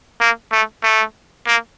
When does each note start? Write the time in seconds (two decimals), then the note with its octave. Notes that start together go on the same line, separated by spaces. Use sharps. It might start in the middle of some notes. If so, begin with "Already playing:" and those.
0.20 A#3
0.52 A3
0.83 A3
1.46 A#3